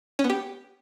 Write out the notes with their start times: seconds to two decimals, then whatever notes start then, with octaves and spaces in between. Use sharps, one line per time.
0.19 C#4
0.24 B3
0.30 G4